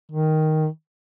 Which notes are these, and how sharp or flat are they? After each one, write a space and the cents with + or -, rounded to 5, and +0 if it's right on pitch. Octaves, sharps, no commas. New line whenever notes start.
D#3 +5